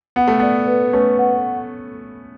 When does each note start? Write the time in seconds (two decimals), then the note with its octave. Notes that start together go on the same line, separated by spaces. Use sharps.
0.16 B3 F#5
0.28 A3
0.40 B3 D5
0.67 B4
0.93 A3 C#4 B4
1.18 F#5